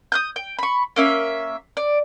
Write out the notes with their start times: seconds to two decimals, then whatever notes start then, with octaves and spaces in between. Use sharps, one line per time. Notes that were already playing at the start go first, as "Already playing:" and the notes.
0.12 D#6 F#6 G6
0.36 G5
0.59 B5 C#6
0.96 A#3 C#4 E5
1.77 D5